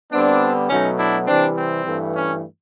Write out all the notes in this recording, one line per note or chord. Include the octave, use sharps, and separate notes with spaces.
D3 G3 B3 C4 D4
B2 F#3 A3 C#4 D#4
D4 E4
C3 E3 G3 C4 D4
C4
G2 E3 A3
C#4